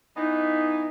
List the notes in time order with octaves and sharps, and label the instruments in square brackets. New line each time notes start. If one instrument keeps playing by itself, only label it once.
[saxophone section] E3 B3 D#4